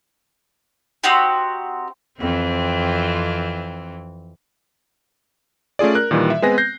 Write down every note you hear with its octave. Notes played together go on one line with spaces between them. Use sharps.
C4 D#4 F#4 G4
F2 E3 C4
A3 C#4 F4 G#4 D5
A#4 F#6
A#2 D#3 E3 G3
E5
G#3 B3 C4 B4 G#5 A#6
G6 A#6 C7